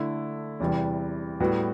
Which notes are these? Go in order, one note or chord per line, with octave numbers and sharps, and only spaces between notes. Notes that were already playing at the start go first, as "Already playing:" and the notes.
Already playing: D3 A3 E4
E2 C3 E3 G3
A2 G3 B3 F#4